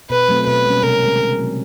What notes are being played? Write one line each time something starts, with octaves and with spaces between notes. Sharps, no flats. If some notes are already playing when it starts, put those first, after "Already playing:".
B2 B4
F#3 A3 C4
B2 B4
G3 A#3 C#4
C3 A#4
D#3 G#3 C4
C#3
F#3 A3 C4